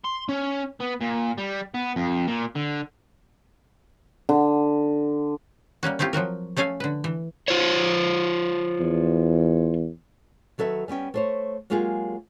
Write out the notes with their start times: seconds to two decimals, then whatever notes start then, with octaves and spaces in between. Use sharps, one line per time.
0.04 C6
0.29 C#4
0.80 B3
1.01 A#2
1.38 G3
1.74 B3
1.96 F2
2.27 A#2
2.55 D3
4.29 D3
5.83 G3 A#3 C#4 F#4
5.99 A3 C4 E4 F4 G4
6.13 F3 F#3 F#4 A#4
6.57 A3 C#4 A4 F5 G#5
6.80 D3 B4
7.04 E3
7.48 F4 C5 C#5
8.80 E2
10.58 D#3 F#3 A4 B4 E5
10.88 G3 B3 C#4 G5
11.14 A3 C5 C#5
11.70 F#3 G#3 A#3 F4 G4 G#4